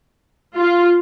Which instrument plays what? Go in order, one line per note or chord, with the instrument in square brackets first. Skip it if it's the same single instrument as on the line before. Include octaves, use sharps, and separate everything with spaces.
[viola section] F4